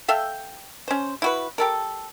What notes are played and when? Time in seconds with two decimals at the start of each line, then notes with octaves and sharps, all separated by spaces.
0.08 A4 E5 F5 G5
0.88 C#4 C5
1.22 E4 F#4 B4
1.58 G4 A4 A#4